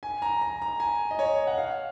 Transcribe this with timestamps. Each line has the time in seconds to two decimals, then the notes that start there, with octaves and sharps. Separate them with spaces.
0.03 G#5
0.22 A#5
0.41 A#5
0.62 A#5
0.80 G#5
1.11 D#5
1.19 C#5
1.47 F#5
1.58 F5